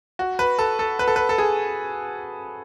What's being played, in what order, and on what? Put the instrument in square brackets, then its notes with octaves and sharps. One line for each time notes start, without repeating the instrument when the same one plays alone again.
[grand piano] F#4
B4
A4
A4
B4
A4
B4
A4
G#4